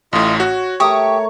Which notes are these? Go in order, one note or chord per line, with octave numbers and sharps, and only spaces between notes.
A1 A2 F4 D#5
F#4 C#5
A3 G4 A#4 C#6 D#6